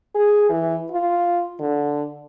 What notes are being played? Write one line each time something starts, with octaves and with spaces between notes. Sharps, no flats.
G#4
E3
F4
D3